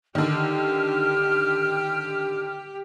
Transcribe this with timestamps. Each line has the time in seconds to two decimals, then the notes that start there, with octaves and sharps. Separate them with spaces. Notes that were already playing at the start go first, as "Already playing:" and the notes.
0.15 D3 D#3 G4 F6